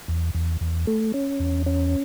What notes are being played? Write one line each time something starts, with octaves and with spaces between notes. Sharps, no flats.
E2
E2
E2
A3
C#4
E2
C#4